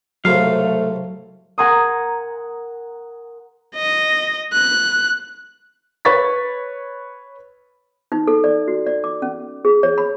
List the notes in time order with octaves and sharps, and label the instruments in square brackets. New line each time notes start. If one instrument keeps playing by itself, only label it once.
[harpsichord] C2 G#2 C#3 [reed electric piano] F#3 [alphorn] A3 [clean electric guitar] F5
[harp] A#4 F#5 G#5 A#5 C6 D#6
[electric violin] D#5
F#6
[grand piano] B4 C#5 C#6 A6 B6
[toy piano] D#4
A4
D5
F#4
D5
D6
C#4
G#4
C#5
B5